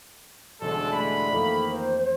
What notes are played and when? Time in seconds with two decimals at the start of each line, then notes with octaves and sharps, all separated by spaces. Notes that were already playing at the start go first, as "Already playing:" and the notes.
0.61 E1 D3 G3 G#3 C#4 A4 C7
0.93 A3 B5
1.31 F2 D#3 A#3 A4
1.70 C5